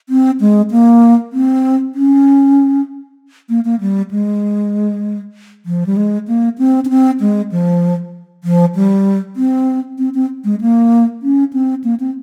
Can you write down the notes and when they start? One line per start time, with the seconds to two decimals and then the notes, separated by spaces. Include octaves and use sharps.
0.09 C4
0.40 G#3
0.71 A#3
1.33 C4
1.95 C#4
3.49 A#3
3.65 A#3
3.81 G3
4.11 G#3
5.66 F3
5.86 G3
5.97 G#3
6.28 A#3
6.58 C4
6.85 C#4
6.89 C4
7.20 G#3
7.52 F3
8.44 F3
8.75 G3
9.36 C4
9.99 C4
10.14 C4
10.44 G#3
10.61 A#3
11.23 C#4
11.53 C4
11.84 A#3
12.00 C4